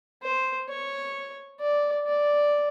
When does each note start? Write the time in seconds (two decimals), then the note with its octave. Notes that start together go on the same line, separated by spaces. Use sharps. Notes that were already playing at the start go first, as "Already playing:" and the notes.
0.23 C5
0.69 C#5
1.60 D5
2.06 D5